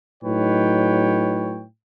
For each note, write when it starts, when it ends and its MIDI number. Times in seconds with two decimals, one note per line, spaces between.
0.23 1.64 45
0.23 1.64 54
0.23 1.64 63
0.23 1.64 71
0.23 1.64 73
0.23 1.64 79